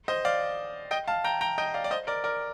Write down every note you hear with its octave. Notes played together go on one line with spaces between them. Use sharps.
C5 D#5
D5 F5
D#5 G5
F5 A5
G5 A#5
G5 A#5
D#5 G5
D5 F5
D5
C5 D#5
A#4 D5
A#4 D5